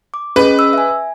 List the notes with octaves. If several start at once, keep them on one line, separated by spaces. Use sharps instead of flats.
D6
C#4 G#4 B4 D#5
E6
E5 G#5